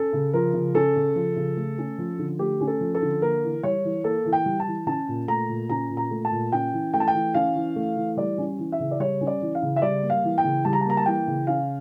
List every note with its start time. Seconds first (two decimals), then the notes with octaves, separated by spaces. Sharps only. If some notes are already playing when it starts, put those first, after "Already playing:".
Already playing: C#4 A4
0.13 C#3
0.33 F3 A#4
0.54 C#3
0.74 C#4 A4
0.96 C#3
1.16 F3
1.36 C#3
1.57 A3
1.78 C#4
1.98 F3
2.19 D3
2.39 A3 G4
2.61 C#4
2.67 A4
2.80 F3
2.95 A4
3.02 D3
3.22 A#3 A#4
3.43 E3
3.63 G3 C#5
3.84 E3
4.04 A#3 A4
4.25 E3
4.33 G5
4.46 G3
4.60 A5
4.67 E3
4.87 C#4 A5
5.08 A#2
5.28 A3 A#5
5.49 A#2
5.70 C#4 A#5
5.90 A#2
5.97 A#5
6.11 A3
6.25 A5
6.32 A#2
6.52 C#4 G5
6.73 E3
6.93 A3 G5
7.00 A5
7.08 G5
7.14 E3
7.34 C#4 F5
7.55 E3
7.76 A3
7.96 E3
8.17 G3 D5
8.38 C#4
8.58 E3
8.72 E5
8.80 C#3
8.91 D5
9.00 G3 C#5
9.21 C#4
9.27 D5
9.41 E3
9.55 F5
9.62 C#3
9.76 E5
9.82 G3 D5
10.02 A#3
10.10 F5
10.24 E3
10.38 G5
10.44 C#3
10.65 G3 A5
10.73 A#5
10.81 A5
10.85 A#3 A#5
10.97 A5
11.06 E3 G5
11.27 C#3
11.47 C#4 F5